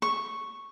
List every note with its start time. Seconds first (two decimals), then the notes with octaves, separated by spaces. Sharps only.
0.02 C#6